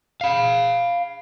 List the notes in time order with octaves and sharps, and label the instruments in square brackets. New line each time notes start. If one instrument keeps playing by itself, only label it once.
[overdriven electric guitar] F5 B5